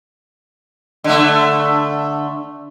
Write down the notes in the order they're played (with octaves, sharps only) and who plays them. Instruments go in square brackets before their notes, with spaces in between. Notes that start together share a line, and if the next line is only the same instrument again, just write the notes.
[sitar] D3 A3